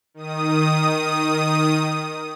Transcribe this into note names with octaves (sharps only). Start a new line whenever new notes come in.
D#3 D#6